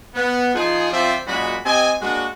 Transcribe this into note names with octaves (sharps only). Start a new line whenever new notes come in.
B3
F3 D#4 F4 G#4
F3 C4 F4 C5 D5 E5
F#2 A#2 G#3 F#4 B5
C4 G4 D#5 G#5
G#3 A#3 D4 F#4